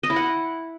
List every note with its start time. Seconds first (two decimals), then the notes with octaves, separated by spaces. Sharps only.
0.03 D#5
0.10 E4
0.16 F#5